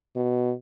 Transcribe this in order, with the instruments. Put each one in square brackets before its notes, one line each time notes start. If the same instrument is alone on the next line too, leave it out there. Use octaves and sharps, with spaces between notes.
[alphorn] B2